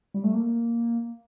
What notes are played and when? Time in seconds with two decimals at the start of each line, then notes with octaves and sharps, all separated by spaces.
0.14 G3
0.24 A3
0.33 A#3